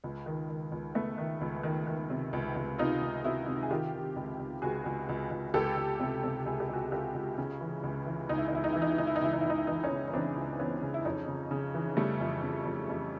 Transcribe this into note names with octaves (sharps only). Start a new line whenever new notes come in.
C#2
D#3
D#3
C#2
C#2 A3 B3
D#3
C#2
D#3
D#3
C3
C#2
C#2
C3 D#4 F4
C#2
C3 E4 F#4
C3
G#4
D#3 F4 G4
D#3
C#2
C#2
C#2 F#4 G#4
C#2
C#2
C#2
C#2 G4 A4
C#2
C3
C3
C#2 G#4
G4
C#2 F#4 G#4
C#2 F4 G4
C#2
C#3
E3
C#2
E3
C#2 D#4
E4
D#4
C#2 E4
D#4
E3 E4
D#4
E4
C#2 D#4
E4
D#4
C#2 E4
D#4
E4
C#2 D#4
E4
E3 D#4
E4
C#4 D#4
C#3
C#4
E3 C4 D4
C#2
E3 B3 C#4
C#3
E4
F2 C#4 D#4
C#3
C#3
E3
C#3 G3 A3
F2
C#3
F2
F2